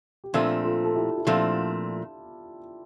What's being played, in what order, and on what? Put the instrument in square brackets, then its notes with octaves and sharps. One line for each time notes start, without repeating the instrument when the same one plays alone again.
[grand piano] G4
[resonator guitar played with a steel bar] A#2 F3 A3 C4 [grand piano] D4 F4
[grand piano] F4 A4
A4
E4 G4
E4
[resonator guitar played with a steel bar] A#2 F3 A3 C4 [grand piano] D4 F4